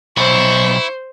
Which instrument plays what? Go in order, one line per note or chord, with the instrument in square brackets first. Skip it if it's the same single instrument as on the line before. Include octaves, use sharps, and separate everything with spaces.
[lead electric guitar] B1 [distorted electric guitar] E4 [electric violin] C5 [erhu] C#6